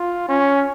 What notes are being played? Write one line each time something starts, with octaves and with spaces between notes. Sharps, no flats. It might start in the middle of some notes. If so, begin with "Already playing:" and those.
Already playing: F4
C#4